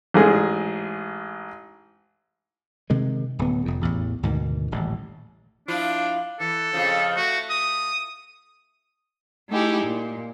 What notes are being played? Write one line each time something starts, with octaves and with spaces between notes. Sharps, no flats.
A1 G#2 G#4
C3 D#3 G#3
D1 B3
F1 F2
A1 E2
D2 G#2 B2 D#3
D#1 A1
F3 D4 E4 F4
E3 A4
F2 C#3 F3
A3 F#4
D#6
A3 D#4 E4 G4 G#4
A#2